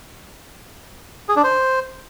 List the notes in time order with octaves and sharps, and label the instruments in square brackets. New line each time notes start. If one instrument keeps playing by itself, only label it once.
[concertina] G#4
D4
C5